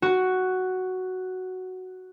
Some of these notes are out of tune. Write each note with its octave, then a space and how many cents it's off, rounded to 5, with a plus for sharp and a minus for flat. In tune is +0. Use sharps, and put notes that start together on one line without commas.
F#4 +5